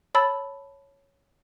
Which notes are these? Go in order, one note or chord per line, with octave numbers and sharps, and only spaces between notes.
C#5 A5 B5 E6 A6